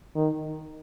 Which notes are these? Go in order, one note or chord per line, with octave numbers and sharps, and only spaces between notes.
D#3